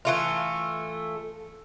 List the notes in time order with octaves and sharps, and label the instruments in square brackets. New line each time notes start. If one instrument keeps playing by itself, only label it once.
[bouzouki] E3 A3 F4